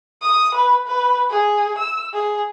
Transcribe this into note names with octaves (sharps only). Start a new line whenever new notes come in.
D#6
B4
B4
G#4
E6
G#4